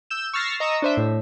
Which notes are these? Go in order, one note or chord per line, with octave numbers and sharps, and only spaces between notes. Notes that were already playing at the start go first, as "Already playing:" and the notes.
E6 G6 E7
C#6 E6 F6 A6 A#6 C7
D#5 A#5 C#6 D#6 E6
D4 C5 E5
A2